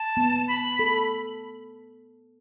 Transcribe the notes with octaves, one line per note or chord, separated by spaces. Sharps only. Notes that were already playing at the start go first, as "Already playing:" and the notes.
Already playing: A5
B3
B5
A4